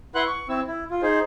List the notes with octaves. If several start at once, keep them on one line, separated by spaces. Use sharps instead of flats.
E4 B4 F#5 C6 F#6
C#6
C4 E4 E6
E4
F4
D#4 G#4 C5